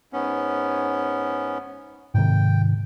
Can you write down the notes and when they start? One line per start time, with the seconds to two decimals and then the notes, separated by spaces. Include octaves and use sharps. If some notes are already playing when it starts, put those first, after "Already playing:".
0.13 G#2 B3 C#4
2.14 G#2 C3 D#3 G5